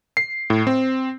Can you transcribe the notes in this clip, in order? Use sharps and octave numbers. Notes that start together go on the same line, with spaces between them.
C7
A2
C4